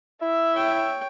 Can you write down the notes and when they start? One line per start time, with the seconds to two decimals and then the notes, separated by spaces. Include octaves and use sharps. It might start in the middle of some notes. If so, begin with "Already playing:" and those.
0.22 E4 E5
0.54 C#5 G5